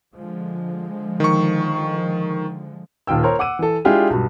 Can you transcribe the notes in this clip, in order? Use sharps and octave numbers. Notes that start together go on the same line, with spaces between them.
D3 F3 G#3
D#3 C#6
D#1 D#3 F4 G5 E6
A#4 C5 C#5
F#5 D6 E6 D#7
E3 A4
G#3 D4 E4 F4 G4 G#4
B1 G2